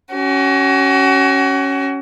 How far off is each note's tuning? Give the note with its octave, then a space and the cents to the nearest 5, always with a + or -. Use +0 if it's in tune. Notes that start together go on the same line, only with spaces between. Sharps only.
C#4 +0 F#4 +35